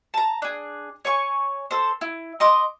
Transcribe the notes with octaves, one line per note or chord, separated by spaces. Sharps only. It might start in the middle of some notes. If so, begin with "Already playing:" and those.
A5 A#5
D4 G#4
C#5 G#5 C#6
A4 C5
E4
D#5 C6 D6 D#6